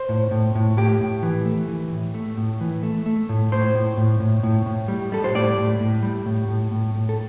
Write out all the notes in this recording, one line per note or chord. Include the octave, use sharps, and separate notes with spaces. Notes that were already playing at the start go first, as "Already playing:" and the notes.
Already playing: C5
A2
A2
A2
A2 G4
A2
E3
A3
E3
A2
A3
A2
E3
A3
A3
A2
A2 C5
A2
A2
A2
A2
A2
G3
G3 A4
C5
A2 D5
A2
A2
G3
A2
A2
A2
A2
A4